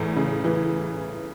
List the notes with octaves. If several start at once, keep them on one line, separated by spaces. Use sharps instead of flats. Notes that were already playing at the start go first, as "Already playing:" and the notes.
Already playing: E2 A2
C#3
E3